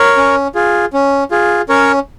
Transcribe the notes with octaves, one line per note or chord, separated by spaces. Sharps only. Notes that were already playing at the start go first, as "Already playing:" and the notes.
Already playing: A#4 C#5
C#4
F4 G#4
C#4
F4 G#4
C#4 A#4 C#5